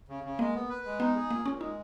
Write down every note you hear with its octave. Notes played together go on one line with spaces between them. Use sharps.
C#3
C#3
G#3 A#3
B3
B4
G#3
B3 D#4
G#4
A#2 A#3
A#2 C#4
G#3 D#4